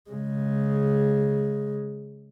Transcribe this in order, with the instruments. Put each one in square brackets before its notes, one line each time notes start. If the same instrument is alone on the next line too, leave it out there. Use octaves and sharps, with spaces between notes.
[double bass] C#3 G#3